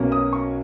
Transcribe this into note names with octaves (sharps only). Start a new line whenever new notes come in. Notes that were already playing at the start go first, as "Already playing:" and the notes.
Already playing: B1 B2 A#3 C#4
D#6
C#6